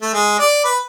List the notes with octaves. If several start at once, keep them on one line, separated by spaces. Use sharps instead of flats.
A3
G#3
D5
B4